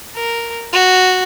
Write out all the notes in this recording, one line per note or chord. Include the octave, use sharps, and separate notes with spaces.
A#4
F#4